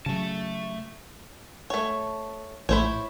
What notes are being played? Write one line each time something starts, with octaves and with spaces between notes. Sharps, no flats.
C#3 F#3 A3 A5
A3 C#5
A#1 A2 E4 C5 C#5